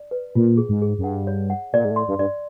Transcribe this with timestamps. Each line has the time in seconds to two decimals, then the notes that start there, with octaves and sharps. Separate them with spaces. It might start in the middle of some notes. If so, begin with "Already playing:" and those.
Already playing: D5
0.11 B4
0.35 A#2 F4
0.57 G#4
0.69 G#2
0.82 G#4
0.98 F#2
1.04 G2 F#5
1.27 C#5
1.50 F#5
1.73 A#2 D5
1.85 G#2
1.91 A2
1.96 C6
2.08 G2
2.18 G2 D5